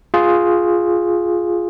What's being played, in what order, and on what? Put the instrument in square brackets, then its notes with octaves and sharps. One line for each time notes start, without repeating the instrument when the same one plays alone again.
[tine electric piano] F4 G#4